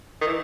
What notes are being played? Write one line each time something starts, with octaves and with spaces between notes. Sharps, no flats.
D#3
E3